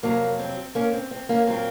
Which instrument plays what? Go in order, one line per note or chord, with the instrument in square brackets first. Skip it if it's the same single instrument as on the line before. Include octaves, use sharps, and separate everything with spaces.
[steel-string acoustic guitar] F2 C3 F#3 A#3
C4
A#3 C#4
C4
C4
A#3 C#4
A#2 F#3 A#3 C4